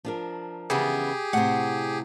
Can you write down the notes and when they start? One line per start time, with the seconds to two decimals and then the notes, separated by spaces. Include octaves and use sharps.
0.05 F3 D4 A#4
0.70 C#3 E3 B3 G4 G#4
1.33 A2 C3 C5 F#5